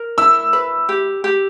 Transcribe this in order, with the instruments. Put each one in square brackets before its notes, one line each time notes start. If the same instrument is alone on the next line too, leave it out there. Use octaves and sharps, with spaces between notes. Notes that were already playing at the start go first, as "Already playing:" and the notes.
Already playing: [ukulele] A#4
[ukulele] E4 [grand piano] E6
[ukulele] B4
G4
G4